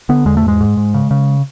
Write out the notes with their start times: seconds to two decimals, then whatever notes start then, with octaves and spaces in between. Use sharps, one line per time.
0.09 D3 B3
0.26 E2 G#3
0.37 A3
0.44 G#2 G#3
0.61 G#2
0.77 G#2
0.94 C#3
1.11 C#3